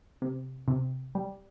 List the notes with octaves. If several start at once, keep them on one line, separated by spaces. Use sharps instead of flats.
C3
C3
G3